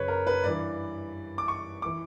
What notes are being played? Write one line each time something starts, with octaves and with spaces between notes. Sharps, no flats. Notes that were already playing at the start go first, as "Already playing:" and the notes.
Already playing: F#2 C#3 B4 C#5
A#4
B4
G2 E3 D5
D6
C#6
E3 D6